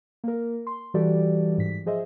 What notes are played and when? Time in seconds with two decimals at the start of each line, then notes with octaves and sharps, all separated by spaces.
0.24 A#3 A#4
0.67 C6
0.94 E3 G3 F#4 G4 A4 D5
1.58 G#2 B6
1.86 F3 G#4 C5 D#5 E5